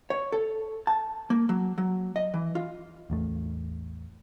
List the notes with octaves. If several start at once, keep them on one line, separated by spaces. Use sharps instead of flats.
C#5
A4
A5
A#3
F#3
F#3
D#5
E3
F4
A1 E2 A3